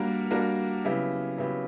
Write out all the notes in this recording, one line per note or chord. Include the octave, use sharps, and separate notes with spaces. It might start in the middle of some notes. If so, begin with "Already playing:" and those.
Already playing: G3 A#3 D4 F#4 A#4
G3 A#3 D4 F#4 A#4
C#3 F#3 B3 E4 G4
C#3 F#3 B3 E4 G4